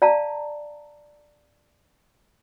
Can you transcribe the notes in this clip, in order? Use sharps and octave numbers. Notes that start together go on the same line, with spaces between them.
D5 F5 A5 A#5